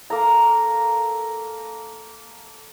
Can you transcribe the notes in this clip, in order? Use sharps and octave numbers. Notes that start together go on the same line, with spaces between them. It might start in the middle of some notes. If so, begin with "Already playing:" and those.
A#3 A4 A#5